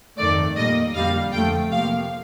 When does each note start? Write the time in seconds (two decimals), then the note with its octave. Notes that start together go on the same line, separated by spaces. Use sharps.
0.18 F2 D#3 A3 D5
0.56 A#2 G3 A#3 D#5
0.95 F2 D3 G3 A#3 F5
1.32 F2 D3 F3 A3 G5
1.71 C3 F3 A#3 F5